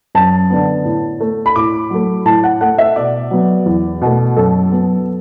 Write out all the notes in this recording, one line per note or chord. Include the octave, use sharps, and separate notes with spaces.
F#2 A5
D3 B3
A2
A3
B5
A2 D6
F#3 A3
A2 A5
F#5
A3 F#5
E5
B2 D5
F#3 B3
E2
B2 A3
F#2 A4
F#3 B3